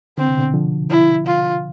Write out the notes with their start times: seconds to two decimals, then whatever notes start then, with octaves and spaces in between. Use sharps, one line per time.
0.18 D3 C4
0.28 C3
0.38 B2 D3
0.54 D3 F3
0.90 E4
1.26 F4